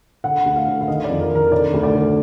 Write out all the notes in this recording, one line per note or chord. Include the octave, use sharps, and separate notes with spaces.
D3 F#5
D2
F5
D3
F5
D#3 D#5
D5
F2
A#4
D#3 A#4
D3 D5
D2
D5
D3